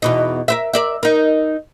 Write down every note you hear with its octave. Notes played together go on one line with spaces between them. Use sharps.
E2 B2 D#4
A#4 C5 E5
A#4 D5 E5
D#4 A#4